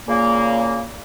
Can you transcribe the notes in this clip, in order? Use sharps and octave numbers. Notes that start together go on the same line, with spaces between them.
A#2 C#3 A#3